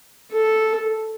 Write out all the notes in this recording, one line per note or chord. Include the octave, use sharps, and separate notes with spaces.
A4